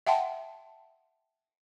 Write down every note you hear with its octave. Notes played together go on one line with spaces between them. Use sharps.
E5 F#5 G5 A5 C6